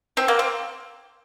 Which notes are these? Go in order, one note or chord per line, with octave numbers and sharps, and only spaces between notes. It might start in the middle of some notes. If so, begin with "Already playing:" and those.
C4
A#3
C4